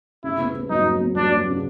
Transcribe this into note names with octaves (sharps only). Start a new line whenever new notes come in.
C#3 E4
B3
B3
F#3 D#4
F#3
B3
F#3 D4
F#3
C#3